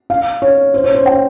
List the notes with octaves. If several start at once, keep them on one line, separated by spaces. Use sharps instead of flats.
F5
C#5
C5
C#5
C5
G5